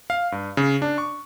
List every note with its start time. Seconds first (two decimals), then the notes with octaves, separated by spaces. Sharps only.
0.10 F5
0.32 G2
0.57 C#3
0.82 D4
0.98 C#6